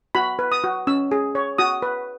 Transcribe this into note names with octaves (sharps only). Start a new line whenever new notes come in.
F#4 B5
B4
D#6
F#4
C#4 E6
G#4
C#5
F#4 D#6
B4